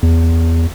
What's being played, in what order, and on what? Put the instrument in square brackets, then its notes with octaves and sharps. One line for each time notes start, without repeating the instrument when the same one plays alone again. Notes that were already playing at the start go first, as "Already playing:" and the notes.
[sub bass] E2